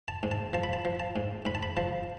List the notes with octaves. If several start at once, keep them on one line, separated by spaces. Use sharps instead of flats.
A5
G#2
A5
F3 A5
B5
A5
F3
A5
G#2
G#2 B5
A5
B5
F3 A5